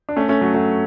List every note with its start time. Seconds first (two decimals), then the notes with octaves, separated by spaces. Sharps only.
0.09 D4
0.16 A3 C#4
0.29 A3 C#4
0.41 F#3 A3
0.54 F#3 A3